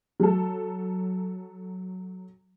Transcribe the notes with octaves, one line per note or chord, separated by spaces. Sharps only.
F#3 A4